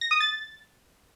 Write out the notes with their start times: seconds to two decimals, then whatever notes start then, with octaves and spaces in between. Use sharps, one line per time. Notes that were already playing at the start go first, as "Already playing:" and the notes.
0.01 A#6
0.11 D#6
0.20 A6